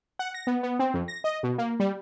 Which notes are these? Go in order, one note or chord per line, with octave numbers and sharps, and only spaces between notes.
F#5
A#6
B3
B3
C4
F2
A#6
D#5
B2
A#3
G3